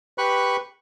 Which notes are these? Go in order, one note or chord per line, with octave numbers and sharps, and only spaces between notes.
G4 B4 B5 C#6 F#6